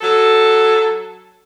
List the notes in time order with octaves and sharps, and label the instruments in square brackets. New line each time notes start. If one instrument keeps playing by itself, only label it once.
[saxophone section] F#3 A4